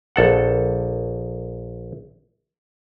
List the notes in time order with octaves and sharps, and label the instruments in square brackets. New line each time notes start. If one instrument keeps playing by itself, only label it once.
[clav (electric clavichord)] A#1 A4 F#5